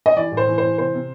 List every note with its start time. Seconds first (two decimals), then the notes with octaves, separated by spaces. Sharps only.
0.06 D#5
0.16 E3 D5
0.32 A2
0.37 C5
0.47 E3
0.58 C5
0.63 E3
0.78 C3 C5
0.94 C3